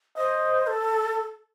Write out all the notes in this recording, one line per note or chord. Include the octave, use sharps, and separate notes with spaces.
C5 D#5
A4